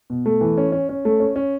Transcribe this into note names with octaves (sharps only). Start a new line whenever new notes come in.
B2
A3
E3
C#4
C#4
C#4
A3
C#4
C#4